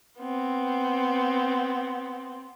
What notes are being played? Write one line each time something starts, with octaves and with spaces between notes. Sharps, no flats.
B3 C4